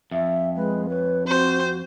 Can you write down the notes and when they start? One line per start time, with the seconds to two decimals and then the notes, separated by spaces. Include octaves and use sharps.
0.11 F2 E5
0.56 G#3 B4
0.89 B4 C#5
1.27 C4 F#4 C5